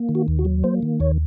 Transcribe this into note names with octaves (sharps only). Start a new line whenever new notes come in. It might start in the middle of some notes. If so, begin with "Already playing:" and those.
Already playing: A#3
D#3
F#4
D#2
F#4
F#3
A#3 C5
D#3
D#2 C#5